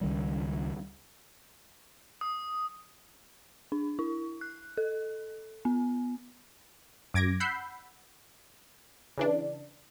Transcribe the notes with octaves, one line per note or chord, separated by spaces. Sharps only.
C#2 D#3 G3
D#6
D4
E4
F#6
A4
B3
F#2 D6 G#6 A#6 D7
F#5 B5 E6 G6 C7
C#3 E3 D4